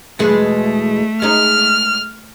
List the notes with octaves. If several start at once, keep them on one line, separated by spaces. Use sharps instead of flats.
E2 B2 G#3 A3
G#3 D#4 F6